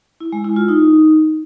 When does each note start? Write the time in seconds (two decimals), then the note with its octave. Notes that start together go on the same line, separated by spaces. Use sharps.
0.21 E4
0.32 G#3
0.44 E4
0.56 F4
0.68 D#4